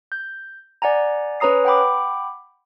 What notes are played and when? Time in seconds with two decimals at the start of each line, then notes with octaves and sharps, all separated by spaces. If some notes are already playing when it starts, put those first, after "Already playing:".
0.12 G6
0.82 D5 F#5 G#5 A#5
1.40 C#4 B4 C#5 A#5 D#6 C7
1.65 F#5 G5 B5 D6